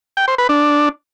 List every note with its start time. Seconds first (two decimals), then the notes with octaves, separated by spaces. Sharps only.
0.17 G5
0.28 C5
0.38 B4
0.49 D4